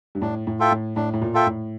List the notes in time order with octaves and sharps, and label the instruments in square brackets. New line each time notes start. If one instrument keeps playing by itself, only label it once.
[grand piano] G2
[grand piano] A2 [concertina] D4
[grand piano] A2
[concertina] F4 A4 E5 G5
[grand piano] A2
[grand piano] A2 [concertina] D4
[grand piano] A2
A#2
[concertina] F4 A4 E5 G5
[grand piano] A2